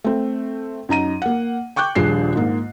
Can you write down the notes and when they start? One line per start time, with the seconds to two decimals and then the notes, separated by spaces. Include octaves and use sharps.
0.04 A3 C4
0.89 F#2 D#4 A#5 D#7
1.22 A#3 F#5
1.76 G5 C#6 D6 F#6 G6
1.95 D#1 A#1 G3 D4 G#4 C7
2.36 G#2 A#3